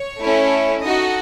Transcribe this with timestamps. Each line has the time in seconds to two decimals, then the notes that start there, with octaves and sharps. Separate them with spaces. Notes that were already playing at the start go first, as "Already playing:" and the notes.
Already playing: C#5
0.21 A3 C#4 E4 A4
0.84 D#4 F#4 A4 D#5